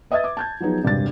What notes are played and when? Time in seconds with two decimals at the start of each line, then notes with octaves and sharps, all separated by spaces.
0.11 B4 D#5 E5 D#6 G#6 A6
0.24 D6
0.37 A5 G6 G#6
0.60 F3 F#3 B3 D#4 G#4
0.83 E1 G2 C3 A6